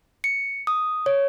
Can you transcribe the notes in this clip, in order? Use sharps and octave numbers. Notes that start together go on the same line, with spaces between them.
C#7
D#6
C#5